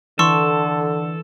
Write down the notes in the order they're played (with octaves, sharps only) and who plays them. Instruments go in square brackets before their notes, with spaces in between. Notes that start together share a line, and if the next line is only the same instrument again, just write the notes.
[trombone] D3 [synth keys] E3 [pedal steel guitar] A4 [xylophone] C6 C#6 E6